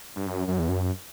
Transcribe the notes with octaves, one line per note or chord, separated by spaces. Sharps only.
G2
F#2
F#2
E2
F#2